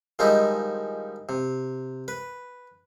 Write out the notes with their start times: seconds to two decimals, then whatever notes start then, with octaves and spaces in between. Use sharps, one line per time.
0.19 D#3 F3 G3 G#3 D#4 E4
1.29 C3
2.08 B4